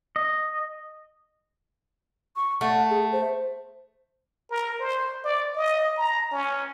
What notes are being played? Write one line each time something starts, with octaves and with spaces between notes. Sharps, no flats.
D#5
C#6
A3 F#5
G#4
C5
A#4
C5
D5
D#5
A#5
C#4